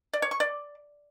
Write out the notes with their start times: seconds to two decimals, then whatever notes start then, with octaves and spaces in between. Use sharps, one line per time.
0.13 D5
0.22 C#5
0.31 C#6
0.40 D5